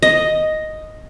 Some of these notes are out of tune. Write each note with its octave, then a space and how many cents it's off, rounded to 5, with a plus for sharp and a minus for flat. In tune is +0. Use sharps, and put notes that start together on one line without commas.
D#5 +0